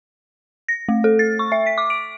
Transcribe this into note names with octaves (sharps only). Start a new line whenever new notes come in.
A#6
A3
A4
A6
C#6
E5
B6
D6
D7